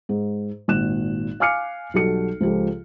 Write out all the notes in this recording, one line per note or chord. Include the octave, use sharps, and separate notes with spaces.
G#2
G#1 A#2 F#6 E7
F5 G#5 D6 F6 C7 C#7
B1 G3 F#4 A4 C#7
C#2 F3 G4 A4